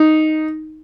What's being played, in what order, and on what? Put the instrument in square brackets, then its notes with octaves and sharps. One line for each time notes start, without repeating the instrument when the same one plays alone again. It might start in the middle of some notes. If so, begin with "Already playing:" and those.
Already playing: [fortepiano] D#4